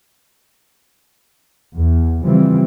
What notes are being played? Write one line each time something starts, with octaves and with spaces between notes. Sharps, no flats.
E2
C#3 E3 F3 G3 C4